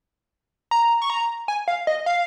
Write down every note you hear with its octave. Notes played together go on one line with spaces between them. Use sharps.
A#5
C#6
A#5
G#5
F5
D#5
F5